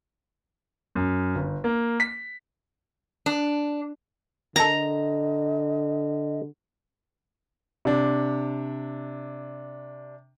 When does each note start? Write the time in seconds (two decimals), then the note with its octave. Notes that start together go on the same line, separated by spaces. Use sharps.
0.95 F#2
1.35 G1
1.64 A#3
2.00 B6
3.26 D4
4.56 D3 A4 A#4 D#5 A#5
7.85 C3 D4